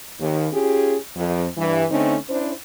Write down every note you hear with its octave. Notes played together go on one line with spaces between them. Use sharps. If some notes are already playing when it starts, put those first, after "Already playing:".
D#2
C#4 F4 G4 G#4
F2
G2 E3
D3 A3 C4 C#4 D#4
C#4 D4 E4 C5